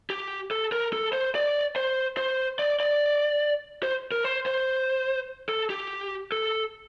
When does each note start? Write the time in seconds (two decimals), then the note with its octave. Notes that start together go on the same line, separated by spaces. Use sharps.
0.10 G4
0.51 A4
0.72 A#4
0.93 A4
1.13 C5
1.35 D5
1.76 C5
2.17 C5
2.59 D5
2.80 D5
3.83 C5
4.12 A#4
4.24 C5
4.46 C5
5.49 A4
5.70 G4
6.32 A4